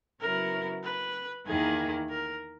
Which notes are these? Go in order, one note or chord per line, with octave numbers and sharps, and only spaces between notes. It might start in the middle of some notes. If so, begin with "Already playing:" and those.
C#3 F#3 B3 E4 A#4
B4
E2 D#3 A#3 E4 G#4 A#4
A#4